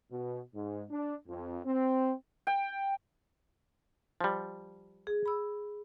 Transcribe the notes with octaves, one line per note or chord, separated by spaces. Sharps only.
B2
G#2
D4
F2
C4
G5
F3 G3
G#4
B5 E6